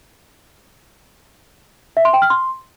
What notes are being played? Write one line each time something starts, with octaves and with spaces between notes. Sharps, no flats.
E5
C6
G5
F6
C6